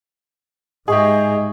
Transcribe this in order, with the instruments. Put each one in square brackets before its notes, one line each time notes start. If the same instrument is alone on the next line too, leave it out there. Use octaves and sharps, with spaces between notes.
[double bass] G#2 [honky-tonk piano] G4 G#4 [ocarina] D#5 [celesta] E5 C#6 D#6